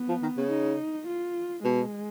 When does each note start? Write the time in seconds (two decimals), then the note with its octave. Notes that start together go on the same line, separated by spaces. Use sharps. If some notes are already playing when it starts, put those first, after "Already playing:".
Already playing: B3
0.09 F3
0.23 D#3
0.37 C#3
0.50 D#4
1.07 F4
1.63 B2 G#3